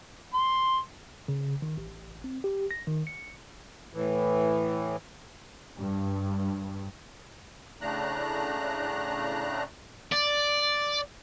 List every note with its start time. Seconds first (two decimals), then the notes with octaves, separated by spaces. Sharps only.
0.34 C6
1.28 C#3
1.62 D#3
1.77 A1
2.24 C4
2.44 G4
2.71 A#6
2.87 D#3
3.07 C#7
3.93 A2 E3
5.77 G2
7.81 A2 C#3 A3 D4 A#5 F#6
10.12 D5